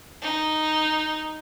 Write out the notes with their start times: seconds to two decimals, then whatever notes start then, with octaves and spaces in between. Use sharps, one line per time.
0.22 D#4